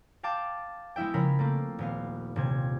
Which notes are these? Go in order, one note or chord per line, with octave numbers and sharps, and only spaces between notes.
F5 G5 A5 D6
G#3 B3 E4 E5 G5
C#3 F3 C#4 A#4 B5 B6
A3 A#3 C4
D#1 B3 F5
D#1 C3 G#6